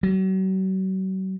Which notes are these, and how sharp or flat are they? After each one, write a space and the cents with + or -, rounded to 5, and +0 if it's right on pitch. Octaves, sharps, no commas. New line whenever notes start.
F#3 +40